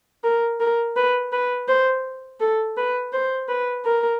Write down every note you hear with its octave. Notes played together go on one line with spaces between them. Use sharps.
A#4
A#4
B4
B4
C5
A4
B4
C5
B4
A#4